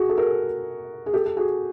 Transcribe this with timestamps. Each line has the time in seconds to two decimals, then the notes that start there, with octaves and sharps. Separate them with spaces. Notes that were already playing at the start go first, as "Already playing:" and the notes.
Already playing: F#4 G#4
0.09 A4
0.17 G#4 A#4
1.06 G#4
1.14 G4 A4
1.26 A4
1.37 F#4 G#4